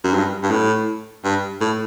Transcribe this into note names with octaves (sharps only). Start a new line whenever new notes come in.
F#2
G2
G2
A2
G2
A2